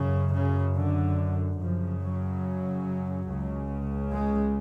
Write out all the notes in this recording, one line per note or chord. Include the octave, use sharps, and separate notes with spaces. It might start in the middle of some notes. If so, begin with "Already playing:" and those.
Already playing: F#2 C#3
C#3
D3
F#2 C#3 F3
F#3
C#2 C#3
G#3